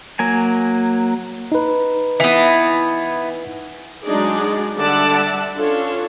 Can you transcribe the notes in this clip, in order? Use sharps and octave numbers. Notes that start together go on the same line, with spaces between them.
F#3 A#3 G#5
D#4 B4
E3 B3
F#3 G#3 D4 D#4 G#4 D5
D3 G3 D5 E5 F#5 A5
C#4 D4 F4 A4 C#5